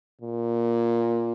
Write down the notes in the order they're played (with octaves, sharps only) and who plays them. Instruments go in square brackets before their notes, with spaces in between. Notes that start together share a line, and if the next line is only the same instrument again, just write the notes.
[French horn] A#2